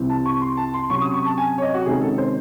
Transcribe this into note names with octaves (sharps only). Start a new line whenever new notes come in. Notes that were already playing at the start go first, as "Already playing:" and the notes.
Already playing: C2 C3 E3 C4
A5
C#6
C6
A5
C6
C3 F#3 C#4 C#6
D#6
C#6
A5
G#5
C#5
D#5
F#4
C3 D#3 G#3 C#4 G#4
A4
C5